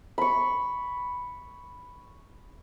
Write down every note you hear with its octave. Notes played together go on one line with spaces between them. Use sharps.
B5 C#6